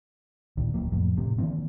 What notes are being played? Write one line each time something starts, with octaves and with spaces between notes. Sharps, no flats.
D2 A#2 D#3
D#1 C#2 F#3 A#3
F2 A2
G1 A2 C3
D#3 E3 A#3 C4